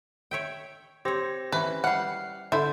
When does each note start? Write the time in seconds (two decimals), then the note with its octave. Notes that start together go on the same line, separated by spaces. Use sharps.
0.31 C#5 E5 G5
1.05 C4 G4 C5 C#5 A#6
1.52 E3 C#4 B4
1.84 E3 G3 F#5 F6 C7
2.52 D3 E4 A4 C5 D5